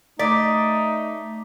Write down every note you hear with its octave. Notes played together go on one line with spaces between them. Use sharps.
A3 D#4 D5 D6 B6